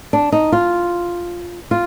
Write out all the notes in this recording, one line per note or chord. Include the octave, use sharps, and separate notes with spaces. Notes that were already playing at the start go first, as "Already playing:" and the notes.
D4
D#4
F4
F4